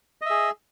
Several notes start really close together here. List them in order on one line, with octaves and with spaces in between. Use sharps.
D#5 E5 G#4